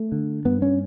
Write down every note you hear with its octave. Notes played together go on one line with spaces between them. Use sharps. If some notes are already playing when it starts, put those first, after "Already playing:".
Already playing: A3
D3
G2 B3
C#4